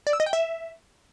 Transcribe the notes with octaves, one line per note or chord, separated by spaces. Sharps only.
D5
E6
D#5
G5
E5